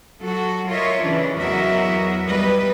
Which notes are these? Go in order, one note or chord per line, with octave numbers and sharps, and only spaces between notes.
F#3 F#4 A4
F4 A#4 C#5 D#5 E5
C#3 E3 C#4 D4
E2 F#3 F#4 A#4 D#5 E5
G3 B4 D#5